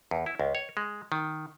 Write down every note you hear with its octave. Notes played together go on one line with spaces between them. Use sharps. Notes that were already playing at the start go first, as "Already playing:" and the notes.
E2
E4
C#2
C#5
G#3
D#3